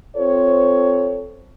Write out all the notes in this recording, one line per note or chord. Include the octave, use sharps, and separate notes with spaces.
C4 F4 A4 C5 C#5